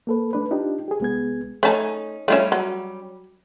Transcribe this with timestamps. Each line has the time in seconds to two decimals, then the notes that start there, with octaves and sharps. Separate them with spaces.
0.07 A#3 A4 B4
0.33 A3 D4 B4
0.51 D4 D#4 F4 G4
0.88 G4 G#4
1.00 C2 G#3 B3 G#4 G#6
1.63 A3 C#4 D#4 G#5 A5
2.28 G3 A3 C#4 F4 E5
2.52 F#3